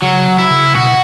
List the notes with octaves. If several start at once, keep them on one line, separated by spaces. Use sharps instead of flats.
C#3 F#3
E4
C#3
B2 F#4